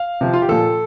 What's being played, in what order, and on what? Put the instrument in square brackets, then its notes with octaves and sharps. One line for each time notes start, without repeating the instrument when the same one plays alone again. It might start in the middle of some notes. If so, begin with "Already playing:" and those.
Already playing: [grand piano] F5
C3 F3
F4
G4
A#2 F3 A4